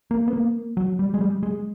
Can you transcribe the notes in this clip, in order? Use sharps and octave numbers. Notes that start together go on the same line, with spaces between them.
A#3
B3
A#3
F#3
G3
G#3
G3
G#3